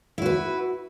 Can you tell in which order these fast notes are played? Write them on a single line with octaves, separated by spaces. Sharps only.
E4 F#4 B4